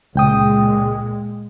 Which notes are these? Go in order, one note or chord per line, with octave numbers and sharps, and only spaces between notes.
C#2 A#2 G#3 G5 D#6